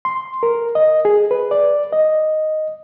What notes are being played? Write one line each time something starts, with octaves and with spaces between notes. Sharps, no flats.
C6
A#4
D#5
G#4
B4
D5
D#5